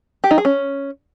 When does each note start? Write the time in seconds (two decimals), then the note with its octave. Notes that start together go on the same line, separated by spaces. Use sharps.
0.24 G4
0.31 D#4
0.38 G#4
0.45 C#4